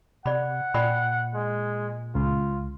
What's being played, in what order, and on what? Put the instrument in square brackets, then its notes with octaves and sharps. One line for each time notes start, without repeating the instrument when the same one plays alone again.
[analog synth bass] C3 [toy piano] D5 B5 [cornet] F#5
[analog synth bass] A#2 [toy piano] D5 G5 B5
[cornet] G#3
[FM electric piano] C#2 [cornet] F4